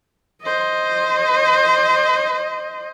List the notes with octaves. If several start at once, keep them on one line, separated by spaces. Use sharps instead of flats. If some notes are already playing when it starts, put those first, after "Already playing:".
C5 D#5